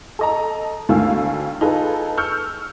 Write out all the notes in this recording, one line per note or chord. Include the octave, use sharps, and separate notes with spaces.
A4 D#5 A#5
D2 D#3 A3 F5 G#5 E6
D#4 F4 G#4 A4 B4
C#6 E6 F6 G6 C#7